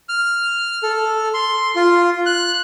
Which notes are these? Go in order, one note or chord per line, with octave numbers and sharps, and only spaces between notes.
F6
A4
C6
F4
F#6